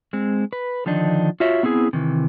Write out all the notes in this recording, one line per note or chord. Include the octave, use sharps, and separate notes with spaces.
G#3 C4
B4
D3 D#3 F3 D4 D#4
F4 F#4 C#5 E5
B3 C4 E4 G#4
C3 D#3 E3